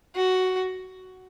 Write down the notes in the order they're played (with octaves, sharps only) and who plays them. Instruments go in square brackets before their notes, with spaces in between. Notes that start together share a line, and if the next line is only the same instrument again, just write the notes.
[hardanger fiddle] F#4